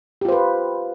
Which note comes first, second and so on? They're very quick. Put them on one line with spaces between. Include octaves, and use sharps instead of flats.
G4 F4 C5 B4